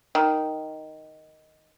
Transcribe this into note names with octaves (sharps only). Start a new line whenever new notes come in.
D#3